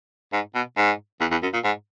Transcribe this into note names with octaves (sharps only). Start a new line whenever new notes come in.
G#2
B2
G#2
E2
E2
F#2
A#2
G#2